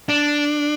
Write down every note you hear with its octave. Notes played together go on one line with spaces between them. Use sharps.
D4